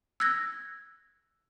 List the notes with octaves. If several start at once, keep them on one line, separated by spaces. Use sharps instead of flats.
E6 F#6 G#6 A#6